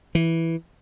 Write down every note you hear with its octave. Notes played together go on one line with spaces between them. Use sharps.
E3